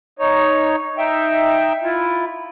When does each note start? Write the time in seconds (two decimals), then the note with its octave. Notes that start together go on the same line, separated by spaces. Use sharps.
0.19 D#4 C#5
0.98 D#4 E5 G5
1.83 E4 F4